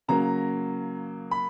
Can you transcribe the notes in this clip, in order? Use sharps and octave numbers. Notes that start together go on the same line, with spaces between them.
C#3 F#3 A#3 A#5
B5